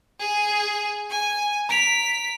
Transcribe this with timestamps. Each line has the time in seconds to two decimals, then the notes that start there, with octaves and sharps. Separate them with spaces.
0.19 G#4
1.10 G#5
1.69 A#5 B6 D7 F7